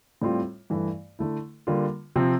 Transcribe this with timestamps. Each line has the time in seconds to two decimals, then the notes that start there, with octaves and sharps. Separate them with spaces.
0.22 A2 G3 C4 F4
0.70 G2 E3 A3 E4
1.19 D3 A3 E4
1.67 D3 G3 A#3 F4
2.16 C3 F3 C4